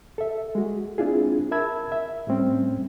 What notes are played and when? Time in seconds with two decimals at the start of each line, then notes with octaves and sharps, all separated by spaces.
0.18 A4 E5
0.55 G#3 F#4
0.98 C4 D4 E4 F4 G#4
1.51 A#4 E5 A5 B5 E6 G#6
1.92 E5
2.27 A2 G3 A3 C4 C#4